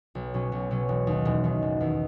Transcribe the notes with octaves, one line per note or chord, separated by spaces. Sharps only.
B1
B2 F#3 C#4
B1
B2 F#3 C#4
E1
D#2 D#3
E1
D#2 D#3
F#1
E2 D#3